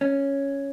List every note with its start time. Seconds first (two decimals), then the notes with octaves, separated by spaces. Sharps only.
0.01 C#4